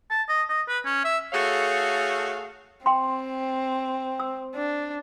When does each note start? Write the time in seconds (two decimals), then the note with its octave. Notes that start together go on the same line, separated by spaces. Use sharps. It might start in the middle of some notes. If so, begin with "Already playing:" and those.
0.10 A5
0.29 D#5
0.49 D#5
0.68 B4
0.85 C#4
1.05 E5
1.32 A3 F#4 G#4 A4 C#5 F5
2.86 C4 G5 C6
4.20 E6
4.55 D4